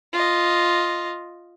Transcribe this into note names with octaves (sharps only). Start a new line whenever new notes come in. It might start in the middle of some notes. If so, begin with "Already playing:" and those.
F4 D#5